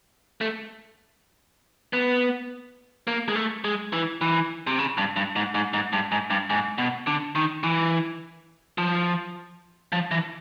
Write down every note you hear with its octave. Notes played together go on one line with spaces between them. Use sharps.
A3
B3
A#3
G#3
A3
G#3
E3
E3
C3
C#3
G2
G2
G#2
G#2
G#2
G2
G#2
G2
G#2
B2
D3
D#3
E3
F3
F3
E3